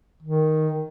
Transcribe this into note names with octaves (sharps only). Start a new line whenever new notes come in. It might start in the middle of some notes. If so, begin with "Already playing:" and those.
D#3